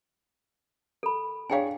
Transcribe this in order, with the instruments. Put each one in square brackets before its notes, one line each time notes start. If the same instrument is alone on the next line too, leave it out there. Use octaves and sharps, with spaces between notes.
[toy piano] A4 B5
[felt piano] D4 G#4 C#5 [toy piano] F5 G5 G#5